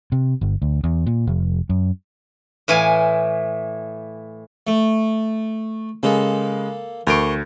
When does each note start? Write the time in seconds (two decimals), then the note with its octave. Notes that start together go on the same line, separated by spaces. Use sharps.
0.12 C3
0.41 G1
0.62 D2
0.84 E2
1.06 A#2
1.27 F1
1.69 F#2
2.68 A2 E3 F5 G#5
4.67 A3
6.03 C#3 G#3 A#3 A4
7.07 D2 A#4 C6 C#6 D7